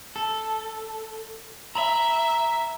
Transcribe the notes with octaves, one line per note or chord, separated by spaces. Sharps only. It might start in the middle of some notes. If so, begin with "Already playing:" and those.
A4
E5 A#5 B5